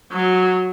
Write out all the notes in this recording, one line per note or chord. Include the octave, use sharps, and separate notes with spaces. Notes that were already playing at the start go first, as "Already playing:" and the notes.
F#3